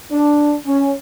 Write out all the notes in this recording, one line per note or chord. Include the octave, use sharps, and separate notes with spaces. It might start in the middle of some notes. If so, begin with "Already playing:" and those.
D4
C#4